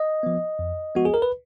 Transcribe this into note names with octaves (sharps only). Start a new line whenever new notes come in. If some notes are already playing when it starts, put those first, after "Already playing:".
Already playing: D#5
F3 B3
F2
F3 G#3 B3 F#4
G#4
A#4
B4